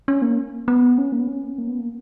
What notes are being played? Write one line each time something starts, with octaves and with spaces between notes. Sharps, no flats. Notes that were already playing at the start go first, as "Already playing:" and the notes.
C#4
A#3
B3
C#4
A#3
B3
C#4
A#3
B3
A#3